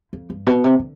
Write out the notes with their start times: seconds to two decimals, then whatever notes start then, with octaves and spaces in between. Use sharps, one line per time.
0.13 F2
0.30 G2
0.47 B2
0.64 C3
0.79 D3